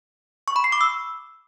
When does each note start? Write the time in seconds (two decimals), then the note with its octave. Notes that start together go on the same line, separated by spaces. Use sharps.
0.48 C#6
0.56 B5
0.64 C7
0.72 D6
0.81 E6